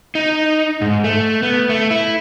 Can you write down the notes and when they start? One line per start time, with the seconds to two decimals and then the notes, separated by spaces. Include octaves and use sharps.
0.15 D#4
0.81 G#2
1.04 A3
1.43 B3
1.70 A3
1.91 E4